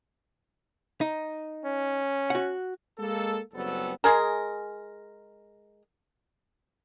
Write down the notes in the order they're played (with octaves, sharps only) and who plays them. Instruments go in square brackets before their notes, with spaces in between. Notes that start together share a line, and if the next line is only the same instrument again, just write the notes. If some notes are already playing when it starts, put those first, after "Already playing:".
[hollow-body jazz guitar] D#4
[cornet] C#4
[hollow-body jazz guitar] F#4 F#5
[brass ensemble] G#3 A#3 A4
F#1 F#3 G3 B3 C4 A4
[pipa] G#3 G#4 A#4